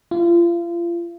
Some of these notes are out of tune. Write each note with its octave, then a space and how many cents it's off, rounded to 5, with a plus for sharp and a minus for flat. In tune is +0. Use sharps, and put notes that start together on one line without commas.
F4 -35